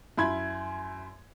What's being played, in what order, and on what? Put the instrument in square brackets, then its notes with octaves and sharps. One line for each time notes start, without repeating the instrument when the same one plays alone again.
[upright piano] F#2 E4 B5 C6 G#6